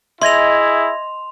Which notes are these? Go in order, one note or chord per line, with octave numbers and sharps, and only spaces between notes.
E4 G#4 D#5 E5 C6 G#6 A#6 F7